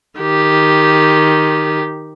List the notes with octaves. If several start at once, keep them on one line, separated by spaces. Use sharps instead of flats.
D#3 G4